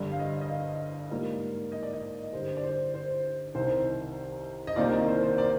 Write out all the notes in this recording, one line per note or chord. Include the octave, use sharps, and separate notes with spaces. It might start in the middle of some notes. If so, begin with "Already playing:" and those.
Already playing: G1 G2 D3 G3
F5
D#5
D#5
F5
G#2 G3 A#3 F4
D#5
D5
D#5
G2 D3 G3 C5
D5
C5
C5
C2 C3 D#3 C5
D#5
C2 C3 D#3 A#3 F4 D5
D5
C5
C5
D5